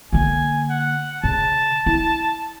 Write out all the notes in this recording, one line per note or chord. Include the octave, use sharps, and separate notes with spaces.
D3 A#3 G#5
F#5
C#3 A5
E4